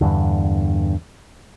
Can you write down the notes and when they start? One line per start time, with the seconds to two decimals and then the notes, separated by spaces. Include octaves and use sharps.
0.01 E2 G2 D3